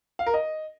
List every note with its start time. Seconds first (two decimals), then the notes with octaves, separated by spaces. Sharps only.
0.19 F5
0.26 A#4
0.34 D#5